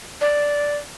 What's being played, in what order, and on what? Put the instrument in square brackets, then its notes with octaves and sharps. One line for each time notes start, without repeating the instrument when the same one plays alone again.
[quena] D5